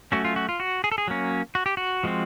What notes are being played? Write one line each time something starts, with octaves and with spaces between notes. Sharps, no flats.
F#3 A3 C#4 F#4
F4
F#4
F4
F#4
G#4
A4
G#4
F#3 A#3 C#4
F#4
G4
F#4
F3 G#3 C4